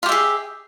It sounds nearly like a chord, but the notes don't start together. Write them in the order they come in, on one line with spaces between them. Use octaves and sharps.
F4 G4 E5 G#4